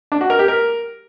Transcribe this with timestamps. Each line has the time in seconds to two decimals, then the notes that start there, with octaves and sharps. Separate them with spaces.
0.12 D4
0.21 F#4
0.30 A#4
0.39 G4
0.48 A#4